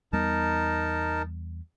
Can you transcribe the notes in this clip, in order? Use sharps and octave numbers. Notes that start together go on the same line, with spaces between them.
E2 G3 B3 D#4 A#4 A5